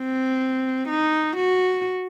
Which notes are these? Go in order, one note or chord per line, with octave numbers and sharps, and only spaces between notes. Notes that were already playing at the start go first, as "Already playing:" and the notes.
Already playing: C4
D#4
F#4